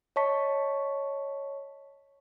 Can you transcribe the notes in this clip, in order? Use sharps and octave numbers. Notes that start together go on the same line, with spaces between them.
C#5 D#5 A5 C#6 B6